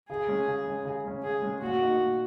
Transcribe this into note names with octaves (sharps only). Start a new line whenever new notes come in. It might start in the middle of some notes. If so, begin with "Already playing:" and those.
C#3 G#4
G#3 C#4
C#3
G#3 C#4
C#3
G#3 C#4
C#3 G#4
G#3 C#4
A#2 F#4
A#3 D#4
A#2